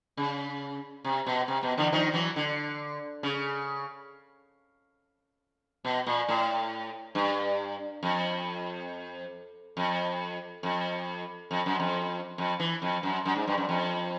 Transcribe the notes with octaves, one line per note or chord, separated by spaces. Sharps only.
C#3
C3
B2
C3
B2
D3 E3
D#3 F3
E3 F#3
D3
C#3
B2
A#2
A2
G2
F2
F2
F2
F2
F#2
F2
F2
E3
F2
F#2
F#2
G#2
G2
F#2
F2